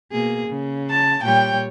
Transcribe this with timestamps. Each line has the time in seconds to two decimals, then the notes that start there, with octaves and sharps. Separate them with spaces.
0.12 B2 A#3 G#4
0.47 C#3
0.90 A5
1.23 A#2 G3 C#5 G5